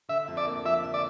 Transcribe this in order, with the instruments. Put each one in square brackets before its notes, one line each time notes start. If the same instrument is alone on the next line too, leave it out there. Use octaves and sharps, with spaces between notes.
[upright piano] D3 [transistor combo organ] E5
[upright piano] F2
[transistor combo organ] D5
[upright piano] A#3
[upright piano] F3 [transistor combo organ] E5
[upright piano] D3
[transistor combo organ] D5